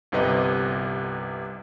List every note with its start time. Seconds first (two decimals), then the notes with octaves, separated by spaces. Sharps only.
0.12 G1 C2 C3 B4 D#5